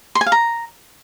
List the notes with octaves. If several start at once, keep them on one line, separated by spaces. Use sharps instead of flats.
C6
G#5
F5
A#5